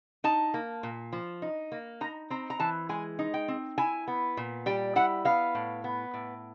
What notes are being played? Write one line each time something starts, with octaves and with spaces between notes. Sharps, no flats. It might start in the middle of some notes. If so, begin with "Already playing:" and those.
D#4 A5
A#3
A#2
F3
D#4
A#3
D#4 A#5
C4 A#5
A#5
E3 A5
G#3 G#5
D#4
G5
C4
E4 G#5
B3
A#2
G3 G5
E4 F#5
B3 F5
A2
B3
A2